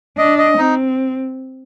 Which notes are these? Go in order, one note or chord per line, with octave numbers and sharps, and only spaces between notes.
D4 D#5
D#5
C4 D#4